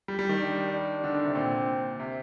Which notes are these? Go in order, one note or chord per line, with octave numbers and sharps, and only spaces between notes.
G3
G3
D#3
D4
D4
D3
D3
C3
A#2 C4
C3